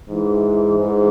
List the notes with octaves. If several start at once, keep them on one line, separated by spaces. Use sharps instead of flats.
G#2 E3
G#2 E3